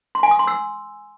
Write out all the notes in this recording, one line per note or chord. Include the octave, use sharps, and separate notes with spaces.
C6
G#5
D#6
C6
E6